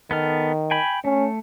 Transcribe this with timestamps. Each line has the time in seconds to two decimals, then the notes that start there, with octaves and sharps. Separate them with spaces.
0.11 D#3 B3 A4 F6
0.71 G5 G#5 B5
1.05 A3 C#4